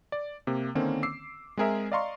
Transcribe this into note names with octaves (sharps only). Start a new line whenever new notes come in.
D5
C3 A#3
D3 D#3 A#3 C4 C#4
D6 E6 C7
G#3 C4 G#4 A#4 E5
D5 D#5 F5 A#5 C6 C#6